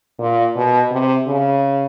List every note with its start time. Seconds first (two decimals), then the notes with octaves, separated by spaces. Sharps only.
0.19 A#2
0.56 B2
0.91 C3
1.27 C#3